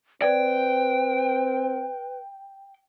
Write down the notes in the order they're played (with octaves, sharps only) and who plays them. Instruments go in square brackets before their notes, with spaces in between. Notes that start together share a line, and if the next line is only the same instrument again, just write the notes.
[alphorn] C4 [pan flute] B4 [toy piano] D5 [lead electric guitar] G5